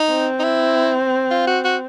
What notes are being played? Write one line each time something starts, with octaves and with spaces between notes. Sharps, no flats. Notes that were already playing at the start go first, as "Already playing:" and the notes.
Already playing: D#4
C4
D#4
E4
F4
F#4
F#4